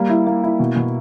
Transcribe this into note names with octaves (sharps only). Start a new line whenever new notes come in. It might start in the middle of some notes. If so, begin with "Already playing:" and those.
Already playing: G3 A#3
E4
A#3
E4
B2
B2